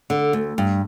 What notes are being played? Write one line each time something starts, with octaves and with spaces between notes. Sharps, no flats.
D3
D2
G2